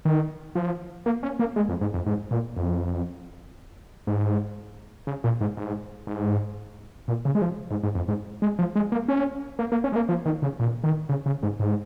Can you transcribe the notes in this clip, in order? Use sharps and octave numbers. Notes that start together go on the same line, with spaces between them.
D#3
F3
A#3
C#4
A#3
G#3
F2
G#2
F2
G#2
A#2
F2
G#2
C#3
A#2
G#2
G#2
G#2
A#2
C#3
G#3
F3
G#2
G#2
F2
G#2
G#3
F3
G#3
A#3
C#4
A#3
A#3
C#4
G#3
A#3
F3
D#3
C#3
A#2
D#3
C#3
C#3
G#2
G#2